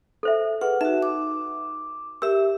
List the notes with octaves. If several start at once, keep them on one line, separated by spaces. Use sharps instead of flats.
A4 C5 E5
G#4 B4 F#5
D#4 F#4 E5
D6
G4 A#4 E5 E6